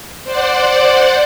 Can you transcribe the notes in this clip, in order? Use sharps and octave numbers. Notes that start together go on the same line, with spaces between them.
C5 D5 F#5